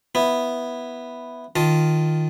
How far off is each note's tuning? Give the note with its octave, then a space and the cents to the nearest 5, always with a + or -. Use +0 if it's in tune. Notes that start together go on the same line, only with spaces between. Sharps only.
B3 +0 E4 +0
D#3 +0 F4 +0 A5 +0